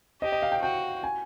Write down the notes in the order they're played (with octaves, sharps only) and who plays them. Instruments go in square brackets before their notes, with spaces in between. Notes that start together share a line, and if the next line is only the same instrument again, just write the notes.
[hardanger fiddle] G4 [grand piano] D#5
[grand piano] D#5
F5
G5
[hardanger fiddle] F#4 [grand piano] G5
[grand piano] G#5